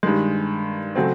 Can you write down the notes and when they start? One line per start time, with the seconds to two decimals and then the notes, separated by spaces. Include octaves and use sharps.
0.03 G2 D#3 G#3
0.95 C#3 F#3 A3 C4